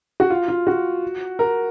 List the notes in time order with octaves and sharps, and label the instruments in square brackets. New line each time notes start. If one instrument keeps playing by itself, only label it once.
[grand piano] F#4
F4
F4
F#4
A#4